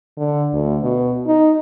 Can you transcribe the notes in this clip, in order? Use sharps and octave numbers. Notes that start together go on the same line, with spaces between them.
D3
D2
B2
D#4